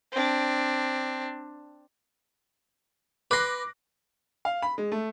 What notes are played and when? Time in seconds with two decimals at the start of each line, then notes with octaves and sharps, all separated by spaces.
0.12 C4 D4
3.31 B4 C6 D6 F#6 A#6
4.45 F5
4.62 B5
4.78 G#3
4.92 A3